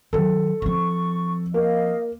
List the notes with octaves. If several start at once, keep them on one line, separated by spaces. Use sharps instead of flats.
D#3 F#3 A4
F3 C4 C#6
A#3 D#5 F5